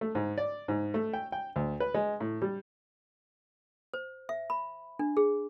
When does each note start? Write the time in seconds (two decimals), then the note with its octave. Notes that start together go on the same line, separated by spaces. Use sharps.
0.01 A3
0.15 G#2
0.38 D5
0.68 G#2
0.94 A3
1.13 G5
1.32 G5
1.56 D2
1.80 B4
1.94 G#3
2.21 A2
2.42 G3
3.94 C5
4.29 E5
4.50 B5
4.99 D4
5.17 G#4